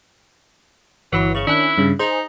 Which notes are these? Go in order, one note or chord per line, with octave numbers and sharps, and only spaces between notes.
G1 E3 F#3 E4
C#3 C#6
D#3 C#4 D4 E4 F#6
G2 C#3
D#4 G#4 C5